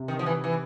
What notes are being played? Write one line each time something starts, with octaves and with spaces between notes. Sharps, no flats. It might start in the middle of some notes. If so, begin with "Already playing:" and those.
Already playing: C3
D#3
F3
E3
E3